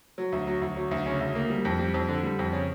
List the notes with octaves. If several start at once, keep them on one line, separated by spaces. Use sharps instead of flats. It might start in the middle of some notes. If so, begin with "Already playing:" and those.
F#3
D2
F#3
D2
F#3
D2
C#3
D2
A#3
G3
F2
G3
F2
D3
G3
F2
C#3